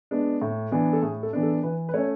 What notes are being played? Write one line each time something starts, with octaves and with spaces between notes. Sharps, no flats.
G#3 B3 D4
A2
E3 B3 D4
A4
A2 G#4
A4
E3 B3 D4
A4
E3 B4
B4
A3 C#4 C#5